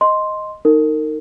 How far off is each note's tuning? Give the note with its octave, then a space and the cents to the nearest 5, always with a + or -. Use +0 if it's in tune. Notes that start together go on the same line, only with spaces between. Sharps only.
D#5 +0 C6 +0
D#4 +0 A#4 -30